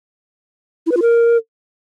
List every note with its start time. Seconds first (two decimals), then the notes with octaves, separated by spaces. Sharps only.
0.86 E4
0.92 B4
0.97 F4
1.02 A#4